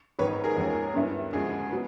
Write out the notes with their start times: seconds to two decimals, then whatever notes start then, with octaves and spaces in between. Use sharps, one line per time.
0.19 G#1 G#2 D#3 B4 C#5
0.44 G#4 A#4
0.56 D#2 D#3 G#3 C#4 F4
0.95 G2 D3 G3 B3 E4
1.33 D2 C#3 F3 G#3 G#4
1.71 F#3 B3